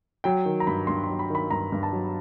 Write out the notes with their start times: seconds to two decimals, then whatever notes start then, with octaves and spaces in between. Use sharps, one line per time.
0.24 F#3 G5
0.45 D#3
0.60 A#5
0.67 G2 B5
0.87 G2 C6
1.04 F#3 C6
1.19 B5
1.30 D#3 B5
1.51 G2 A#5
1.72 G2
1.83 A5
1.93 F#3